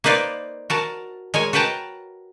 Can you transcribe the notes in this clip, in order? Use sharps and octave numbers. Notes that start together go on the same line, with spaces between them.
A#3 D#4 B4 C5 D5 F5
F#4 A#4 A5
G#3 A#4 C#5 G#5
F#4 A#4 B4 G5 A5 A#5